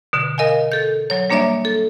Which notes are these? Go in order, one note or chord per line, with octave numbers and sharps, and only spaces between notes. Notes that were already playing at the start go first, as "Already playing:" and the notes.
B2 D3
A#4 D#5 F5 G#5
A4 G6
F#3 C#5
G3 A#3 D4 C#5 D5 E5
A4